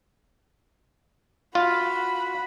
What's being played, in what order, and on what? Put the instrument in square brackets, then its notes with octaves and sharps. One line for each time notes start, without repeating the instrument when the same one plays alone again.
[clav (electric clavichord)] F4 [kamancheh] F#4 B5